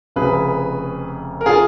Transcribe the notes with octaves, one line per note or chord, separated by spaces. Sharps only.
F1 F2 C#3 G#4 B4
A#4
F4 G#4